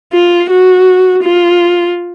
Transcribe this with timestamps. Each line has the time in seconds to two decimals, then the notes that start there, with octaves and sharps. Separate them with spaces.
0.13 F4
0.50 F#4
1.23 F4